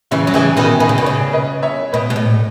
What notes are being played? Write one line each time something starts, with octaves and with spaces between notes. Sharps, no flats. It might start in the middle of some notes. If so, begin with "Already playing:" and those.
C#3 E3 C#4 E4
F#3
C#3 E3 E4 G#4
B2 D#3 G#4 B4
D#3 G#4 B4
C#3
B2
C#3 G#4 B4
B4 D#5
C#5 E5
B2 B4 D#5
B2
A2